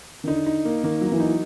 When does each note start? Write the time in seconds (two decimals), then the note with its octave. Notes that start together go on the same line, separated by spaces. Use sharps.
0.24 D#3
0.27 D3 D#4
0.46 D#4
0.65 A#3
0.83 D#3 A#3
1.01 F#3
1.12 E3
1.20 D#4